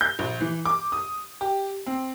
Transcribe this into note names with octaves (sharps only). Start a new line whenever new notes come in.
G6
A#1
E3
D6
D#6
G4
C4